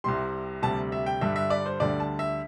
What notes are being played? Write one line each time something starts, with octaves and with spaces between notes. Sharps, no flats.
C2 C3 G3 C6
D2 C3 G3 A5
E5
G5
G2 D3 G3 E5
E5
D5
C5
D2 D3 G3 D5
A5
E5